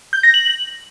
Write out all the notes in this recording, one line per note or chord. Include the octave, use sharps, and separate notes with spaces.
G6
A#6
F#7